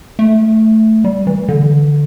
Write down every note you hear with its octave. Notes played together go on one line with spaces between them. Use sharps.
A3
G3
E3
D3